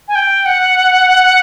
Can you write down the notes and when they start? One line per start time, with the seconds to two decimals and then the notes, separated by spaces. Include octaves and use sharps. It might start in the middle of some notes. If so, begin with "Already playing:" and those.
0.08 G#5
0.15 G5
0.46 F#5